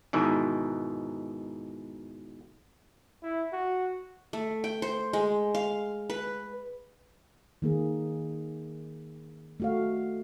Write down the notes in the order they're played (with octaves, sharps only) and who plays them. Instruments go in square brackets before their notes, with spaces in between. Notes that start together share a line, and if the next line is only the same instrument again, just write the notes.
[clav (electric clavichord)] G#2 B2 D#3 E3
[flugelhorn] E4
F#4
[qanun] A3
G5
C5
G#3
F5
B4
[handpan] D#3 A#3 G#4
A3 F#4 F5